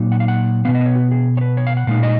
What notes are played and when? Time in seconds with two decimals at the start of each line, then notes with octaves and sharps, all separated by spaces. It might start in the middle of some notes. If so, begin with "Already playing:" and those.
Already playing: A#2 F#3 A#3 D#4
0.12 F#5
0.20 F5
0.28 F#5
0.65 B2 G#3 B3 F5
0.75 D#5
0.81 B4
0.86 C#5
0.96 F#4
1.11 G#4
1.37 C#5
1.41 B4
1.57 C#5
1.67 F5
1.77 F#5
1.87 A#2 G#3 D#4 F5
2.03 D#5